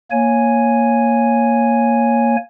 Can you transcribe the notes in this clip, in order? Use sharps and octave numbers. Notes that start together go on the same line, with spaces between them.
A#3 C#5 G#5